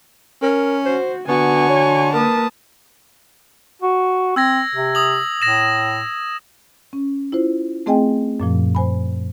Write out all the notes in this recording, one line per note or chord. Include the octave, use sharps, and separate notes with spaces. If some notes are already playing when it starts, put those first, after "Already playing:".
C#4 A#4
F#4 C5
D3 B3 F#4 G#5 C#6
C#5
A#3 A#4 B4 A5 D#6
F#4
C4 E6 G#6 A#6
C3
D#6 F#7
A2 A#6 E7
C#4
E4 F4 C5
A3 C4 G#4 D#5 G5 G#5
F#2 A#2 F3
C5 G#5 B5